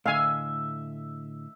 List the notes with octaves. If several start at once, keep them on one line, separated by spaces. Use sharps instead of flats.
A2 D3 E5 F5 G#5